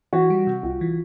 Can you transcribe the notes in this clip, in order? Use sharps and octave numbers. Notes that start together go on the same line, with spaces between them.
E3 F#4
G3
C3
C2 F4
E3